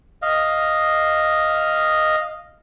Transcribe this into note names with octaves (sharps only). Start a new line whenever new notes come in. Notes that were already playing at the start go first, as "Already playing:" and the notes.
D#5 F5